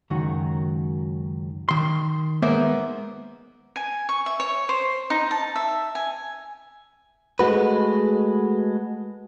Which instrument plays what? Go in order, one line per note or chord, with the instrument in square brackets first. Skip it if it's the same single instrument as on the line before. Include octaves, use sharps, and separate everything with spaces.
[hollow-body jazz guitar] C#2 F#2 D#3 F#3 F#4
D#3 C6
G#3 A#3 B3 A#4 C5 E5
[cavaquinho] G#5
C#6
E5
C#5
C5
D#4
A5
E5
G#5
[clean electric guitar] G#3 A3 F#4 B4